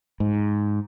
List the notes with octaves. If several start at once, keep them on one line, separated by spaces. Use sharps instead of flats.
G#2